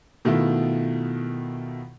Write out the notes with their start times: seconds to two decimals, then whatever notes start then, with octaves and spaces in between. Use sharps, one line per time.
0.25 B2 D#3 A3 B3 E4 F4